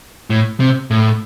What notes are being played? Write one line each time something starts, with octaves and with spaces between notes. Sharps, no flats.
A2
C3
A2